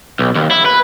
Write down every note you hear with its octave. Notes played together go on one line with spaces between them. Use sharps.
B1
D#2
E4
B4